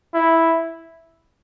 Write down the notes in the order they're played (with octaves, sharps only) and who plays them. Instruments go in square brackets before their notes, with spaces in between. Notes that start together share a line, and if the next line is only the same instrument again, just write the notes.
[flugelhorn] E4